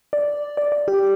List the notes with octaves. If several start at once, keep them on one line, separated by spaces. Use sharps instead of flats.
D5
D5
D5
G4